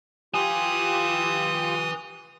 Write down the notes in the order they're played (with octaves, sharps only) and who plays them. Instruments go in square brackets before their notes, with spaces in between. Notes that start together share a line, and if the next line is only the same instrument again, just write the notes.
[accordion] F4 G4 [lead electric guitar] B4 G#5 [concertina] D#6